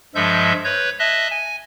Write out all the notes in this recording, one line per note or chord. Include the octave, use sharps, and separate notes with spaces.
G2 F3 G#3 A4 E5 G6
B4 C#5 G6
D#5 E5 A5 F#6
G#5